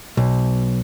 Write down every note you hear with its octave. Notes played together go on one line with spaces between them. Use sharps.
B1